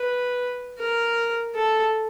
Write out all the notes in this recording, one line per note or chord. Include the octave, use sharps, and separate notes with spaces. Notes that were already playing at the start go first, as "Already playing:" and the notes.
Already playing: B4
A#4
A4